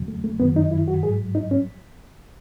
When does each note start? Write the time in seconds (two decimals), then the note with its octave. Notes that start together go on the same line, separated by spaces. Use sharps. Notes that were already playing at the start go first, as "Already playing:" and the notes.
Already playing: E2 C#3 F#3
0.08 A3
0.24 A3
0.40 F#2 D#3 F#3 B3
0.56 D#4
0.71 E4
0.88 F#4
1.03 G#2 F#3 G#4
1.35 D#4
1.51 C#4